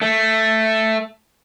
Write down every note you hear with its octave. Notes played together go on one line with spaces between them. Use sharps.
A3